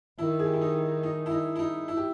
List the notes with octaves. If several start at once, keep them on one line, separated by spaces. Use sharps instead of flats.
D#3 E4
G#4
G4
E4
D#4
D#4
E4
D#4
E4
D#4
E4
G4